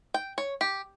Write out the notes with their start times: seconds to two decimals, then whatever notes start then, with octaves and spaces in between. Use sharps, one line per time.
0.14 G5
0.38 C#5
0.61 G4